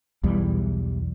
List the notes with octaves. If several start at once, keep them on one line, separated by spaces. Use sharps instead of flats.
B1 E2 E3 G3